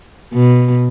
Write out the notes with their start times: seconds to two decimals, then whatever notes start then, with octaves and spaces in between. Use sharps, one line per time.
0.34 B2